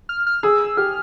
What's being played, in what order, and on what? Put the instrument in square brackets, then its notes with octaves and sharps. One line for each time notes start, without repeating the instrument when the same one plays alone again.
[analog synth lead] F6
F6
[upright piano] G#4 [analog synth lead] E6
[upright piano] G4 [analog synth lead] F6